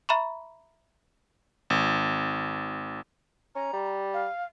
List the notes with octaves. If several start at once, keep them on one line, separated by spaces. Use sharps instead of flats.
E5 A#5 B5 C#6
G#1
C#4 A#5
G3
F5